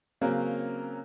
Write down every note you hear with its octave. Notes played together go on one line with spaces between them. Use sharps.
C#3 F#3 A#3 C4 C#4